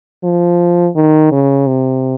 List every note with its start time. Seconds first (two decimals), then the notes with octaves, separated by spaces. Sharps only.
0.24 F3
0.96 D#3
1.32 C#3
1.67 C3